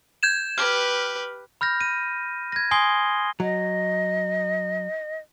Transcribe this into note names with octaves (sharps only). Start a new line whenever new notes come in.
G6 G#6 E7
G4 B4 F6
B5 F6 G6 A#6
D#7
G#6 A#6
G#5 C6 D#6 G#6 C7 G7
F#3 D#5